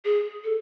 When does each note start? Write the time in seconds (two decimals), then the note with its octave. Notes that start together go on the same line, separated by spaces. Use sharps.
0.05 G#4
0.44 A4